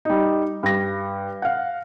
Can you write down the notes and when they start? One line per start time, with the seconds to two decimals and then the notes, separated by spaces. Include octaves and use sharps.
0.05 G3 D#4
0.63 G2 A#6
1.42 F5 F#5